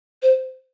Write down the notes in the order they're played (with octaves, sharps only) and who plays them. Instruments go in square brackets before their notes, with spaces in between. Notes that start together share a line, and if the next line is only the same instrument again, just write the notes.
[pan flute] C5